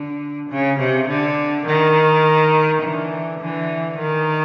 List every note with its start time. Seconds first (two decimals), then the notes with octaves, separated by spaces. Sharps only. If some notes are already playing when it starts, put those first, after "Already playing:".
Already playing: D3
0.50 C#3
0.79 C3
1.08 D3
1.66 D#3
2.82 D3 E3
3.40 D3 E3
3.98 D#3